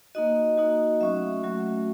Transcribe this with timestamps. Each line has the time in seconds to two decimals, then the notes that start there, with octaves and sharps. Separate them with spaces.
0.15 A#3 D#4 F#4 D#5
0.57 A#3 D#4 F#4
1.01 F#3 A3 C#4 F#4 E5
1.43 F#3 A3 C#4 F#4